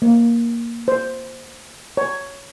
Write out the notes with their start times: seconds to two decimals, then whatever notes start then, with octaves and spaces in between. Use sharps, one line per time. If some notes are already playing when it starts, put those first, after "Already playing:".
0.02 A#3
0.88 C5
1.97 C#5